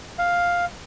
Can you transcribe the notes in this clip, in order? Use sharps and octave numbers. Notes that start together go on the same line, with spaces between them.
F5